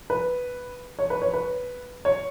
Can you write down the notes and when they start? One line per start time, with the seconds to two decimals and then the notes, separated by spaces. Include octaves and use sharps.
0.10 B4
0.99 C#5
1.10 B4
1.22 C#5
1.34 B4
2.05 C#5